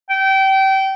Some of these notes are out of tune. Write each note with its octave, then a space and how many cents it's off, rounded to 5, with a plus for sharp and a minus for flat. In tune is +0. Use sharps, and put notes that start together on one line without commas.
G5 -25